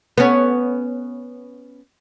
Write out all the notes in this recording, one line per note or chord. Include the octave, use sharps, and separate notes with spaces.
B3 C#4